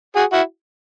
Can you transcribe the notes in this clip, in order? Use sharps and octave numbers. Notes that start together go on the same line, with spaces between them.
F#4 G#4
E4 F#4